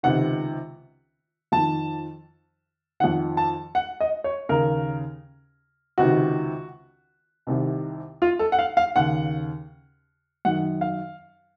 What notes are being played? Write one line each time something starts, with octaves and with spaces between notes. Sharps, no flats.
C#2 C3 D#3 F#5
F2 D#3 A5
F2 D#3 F#5
A5
F#5
D#5
C#5
D#2 C#3 A#4
C#2 C3 D#3 F#4
C2 C3 D#3
F4
A4
F#5
F5
F5
D#2 C#3 F#5
F#2 D#3 F#5
F5